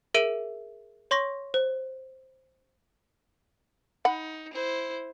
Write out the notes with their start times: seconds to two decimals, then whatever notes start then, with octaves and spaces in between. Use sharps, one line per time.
0.14 G#4 A#4 E5 D7 D#7 G7
1.11 C#5 C6 C#6 A#6
1.54 C5
4.05 D#4 F#5 B5
4.53 E4 C5